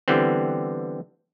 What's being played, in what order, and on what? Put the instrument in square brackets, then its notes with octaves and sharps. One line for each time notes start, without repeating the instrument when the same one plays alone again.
[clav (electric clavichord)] D3 E3 G3 B3 C4